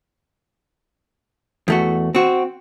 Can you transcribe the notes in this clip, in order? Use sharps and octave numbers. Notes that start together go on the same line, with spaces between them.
E2 A3 F#4
C4 F#4